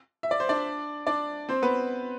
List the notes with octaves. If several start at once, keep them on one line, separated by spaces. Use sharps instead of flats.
E5
D5
C5
D4 D5
D4 D5
C4 C5
B3 B4